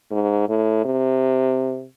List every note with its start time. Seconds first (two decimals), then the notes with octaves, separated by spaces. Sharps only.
0.11 G#2
0.48 A2
0.85 C3